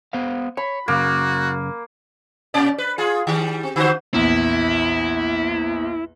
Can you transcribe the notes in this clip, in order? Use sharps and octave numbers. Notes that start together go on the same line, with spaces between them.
B3 C5 F5
C#5 B5
F#2 C#3 A#3 F#4
A#2 C#4 D5
B4
F4 G#4
D#3 G3
C4
D3 F#4 C5
A#1 E2 E4